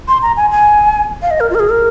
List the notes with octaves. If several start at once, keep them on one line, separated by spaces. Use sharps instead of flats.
C6
A#5
G#5
G#5
F5
D#5
A#4
F4
A#4
G#4
A#4